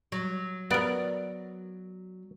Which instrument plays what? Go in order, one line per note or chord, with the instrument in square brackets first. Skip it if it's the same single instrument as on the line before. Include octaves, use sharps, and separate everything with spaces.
[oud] F#3
[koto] B3 A#4 [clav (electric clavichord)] D5